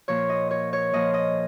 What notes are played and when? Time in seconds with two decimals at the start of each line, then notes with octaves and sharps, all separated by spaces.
0.08 A#2 F3 C#5
0.29 D#5
0.51 C#5
0.73 C#5
0.93 A#2 F3 D#5
1.14 D#5